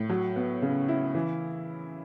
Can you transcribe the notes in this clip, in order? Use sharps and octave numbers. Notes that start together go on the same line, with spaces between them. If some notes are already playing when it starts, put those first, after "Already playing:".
Already playing: A2
F#3
B3
C#3
E4
E3